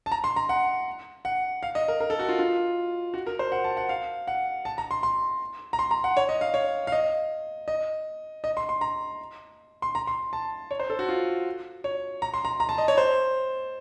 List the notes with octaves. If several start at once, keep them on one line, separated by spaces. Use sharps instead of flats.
A5
A#5
C6
A#5
F#5
F#5
F5
D#5
A#4
A#4
A4
F#4
F4
F4
F#4
A#4
C5
F#5
A5
F#5
F5
F#5
A5
A#5
C6
C6
A#5
C6
A#5
F#5
C#5
D#5
F5
C#5
F5
D#5
D#5
D#5
C6
C6
A#5
C6
A#5
C6
A5
C#5
C5
A4
F#4
F4
C#5
A#5
C6
A#5
A#5
A5
D#5
C#5
C5